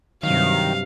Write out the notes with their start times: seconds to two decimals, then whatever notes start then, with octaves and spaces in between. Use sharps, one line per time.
0.23 G2 C3 D#3 F#3 F5